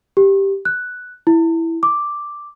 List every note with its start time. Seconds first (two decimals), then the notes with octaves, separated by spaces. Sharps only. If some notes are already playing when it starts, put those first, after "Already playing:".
0.17 G4
0.65 F#6
1.27 E4
1.83 D6